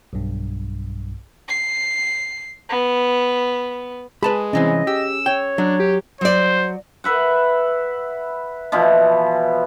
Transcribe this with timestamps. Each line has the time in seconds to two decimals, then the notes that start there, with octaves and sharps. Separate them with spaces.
0.13 B1 G2
1.49 C7
2.69 B3
4.23 G#3 G#4 B4 A5 B5
4.53 C2 E3 C4 C#4 D#5
4.87 G4 E6
5.26 C#5 G5
5.58 F#3 D4
5.80 G4
6.21 F#3 C5 D5
7.04 B4 E5 F#5
8.72 B2 E3 F3